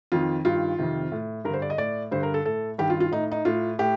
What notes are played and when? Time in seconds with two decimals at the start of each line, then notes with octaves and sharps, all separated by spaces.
0.12 F2 D#3 F4
0.45 G2 D#3 F4
0.79 F2 C3 D#3
1.12 A2
1.45 G2 A#4
1.49 D3 C5
1.62 D5
1.70 D#5
1.78 A2 D5
2.11 G2 D3 C5
2.23 A#4
2.34 A4
2.45 A2 A4
2.78 G2 D#3 G4
2.90 F4
3.00 F4
3.12 A2 D#4
3.32 D#4
3.45 A2 F4
3.79 A2 G4